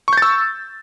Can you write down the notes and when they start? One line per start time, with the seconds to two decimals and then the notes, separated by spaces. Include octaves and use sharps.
0.08 C#6
0.13 G6
0.17 A6
0.22 E6